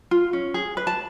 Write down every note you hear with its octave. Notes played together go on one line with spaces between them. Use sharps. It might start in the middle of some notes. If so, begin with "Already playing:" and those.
F4
C#4
G#4
B4
A5